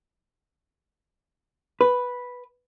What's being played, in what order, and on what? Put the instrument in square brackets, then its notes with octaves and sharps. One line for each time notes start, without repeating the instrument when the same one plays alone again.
[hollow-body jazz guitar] B4